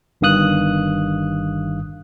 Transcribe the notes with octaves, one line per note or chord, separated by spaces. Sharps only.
G1 G2 D#3 F5 D#6 F#6